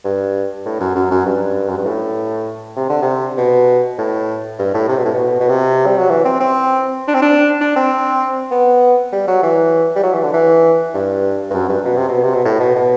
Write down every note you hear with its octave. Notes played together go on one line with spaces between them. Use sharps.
G2
A2
F#2
F#2
F#2
G2
F#2
G2
A2
C3
D3
C3
B2
A2
G2
A2
C3
B2
A2
B2
B2
C3
G3
F#3
E3
C4
C4
D4
C4
D4
D4
C4
B3
G3
F#3
E3
G3
F#3
E3
D3
E3
G2
G2
F#2
G2
B2
C3
B2
C3
B2
A2
B2
B2